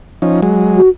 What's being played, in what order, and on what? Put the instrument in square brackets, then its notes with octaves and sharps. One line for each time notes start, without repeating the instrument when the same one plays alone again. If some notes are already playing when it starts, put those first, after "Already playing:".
[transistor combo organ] F3 C#4 D#4
F#3 G#3
[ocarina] F#4